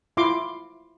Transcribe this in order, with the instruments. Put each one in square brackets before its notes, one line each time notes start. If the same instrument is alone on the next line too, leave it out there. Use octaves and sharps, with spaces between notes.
[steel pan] E4 F4 C6 D6